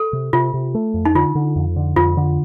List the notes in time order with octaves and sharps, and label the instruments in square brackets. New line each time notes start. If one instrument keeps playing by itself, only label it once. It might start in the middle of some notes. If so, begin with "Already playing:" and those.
Already playing: [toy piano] A4
[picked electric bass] C3
[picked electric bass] C3 [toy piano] F4
[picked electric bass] C3
A3
F2
[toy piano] D#4
[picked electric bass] D3 [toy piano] F4
[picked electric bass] D3
F2
D3
[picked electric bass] F2 [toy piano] F4
[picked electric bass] D3